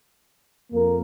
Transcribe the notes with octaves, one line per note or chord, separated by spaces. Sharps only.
F2 A#3 A#4